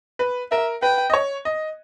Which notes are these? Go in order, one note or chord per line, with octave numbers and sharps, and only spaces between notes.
B4
A#4 E5
B4 G5
D#5
C#5
D#5